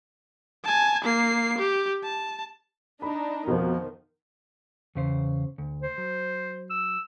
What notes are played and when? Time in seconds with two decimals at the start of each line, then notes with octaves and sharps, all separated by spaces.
0.64 G#5 A5
1.04 A#3 C7
1.58 G4
2.04 A5
3.02 D4 D#4 B5
3.48 F2 B2 D#3 F3
4.95 E2 C#3 C5
5.58 D2
5.82 C5
5.98 F#3
6.70 E6